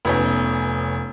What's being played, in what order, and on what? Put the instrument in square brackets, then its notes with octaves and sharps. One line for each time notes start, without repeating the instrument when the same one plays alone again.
[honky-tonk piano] F1 B3 C#4